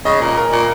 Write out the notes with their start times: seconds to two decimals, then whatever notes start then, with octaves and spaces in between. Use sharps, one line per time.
0.05 C#3 D#5
0.21 A#2
0.37 A#4
0.52 A#2